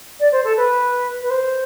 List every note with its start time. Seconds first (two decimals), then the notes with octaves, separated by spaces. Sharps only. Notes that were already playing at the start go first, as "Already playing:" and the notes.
0.20 D5
0.32 C5
0.44 A4
0.57 B4
1.22 B4
1.30 C5